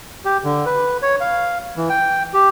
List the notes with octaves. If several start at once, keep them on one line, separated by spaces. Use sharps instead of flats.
G4
D3
B4
C#5
F5
E3
G5
G4